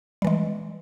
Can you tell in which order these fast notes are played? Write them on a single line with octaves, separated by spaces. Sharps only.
G3 E3 G#3